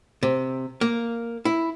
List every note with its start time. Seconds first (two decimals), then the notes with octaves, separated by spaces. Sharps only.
0.23 C3
0.81 A#3
1.45 E4